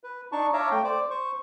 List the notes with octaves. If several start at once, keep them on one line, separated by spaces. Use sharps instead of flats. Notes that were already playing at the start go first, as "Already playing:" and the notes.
B4
D4 D#4 A5 C#6
C#5 E5 F5 A5 A#5 D6
A3 G5
C5 D5 D6
C5 C#6